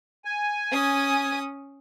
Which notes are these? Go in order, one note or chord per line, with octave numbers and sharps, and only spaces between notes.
G#5
C#4 D#6